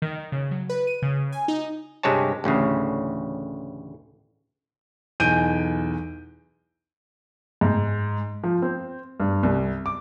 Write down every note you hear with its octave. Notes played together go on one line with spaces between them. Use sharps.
D#3
C#3
F#3
B4
D#7
C#3
G#5
D#4
G2 C3 G#3 C4 C#5 A5
A1 D2 A2 C#3
B1 E2 G#5 G6 D7 D#7
G#2
F3
C4
G2
C2
D6